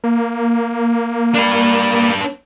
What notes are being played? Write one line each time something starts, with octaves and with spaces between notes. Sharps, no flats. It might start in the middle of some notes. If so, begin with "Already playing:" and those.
A#3
D4 B4